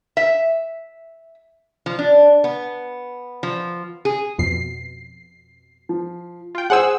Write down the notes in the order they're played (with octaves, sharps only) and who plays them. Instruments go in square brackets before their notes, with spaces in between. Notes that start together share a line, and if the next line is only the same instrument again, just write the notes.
[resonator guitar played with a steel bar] E5
F3
D4
B3
F3
G#4
[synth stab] F2 B2 C7
[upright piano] F3
[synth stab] F4 G5
[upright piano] G#4 C5 [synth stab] F#5 G#5 E6